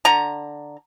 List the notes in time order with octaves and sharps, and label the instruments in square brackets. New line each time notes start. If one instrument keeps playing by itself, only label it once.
[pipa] D3 A#5